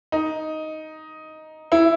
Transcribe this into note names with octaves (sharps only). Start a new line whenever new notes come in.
D#4
E4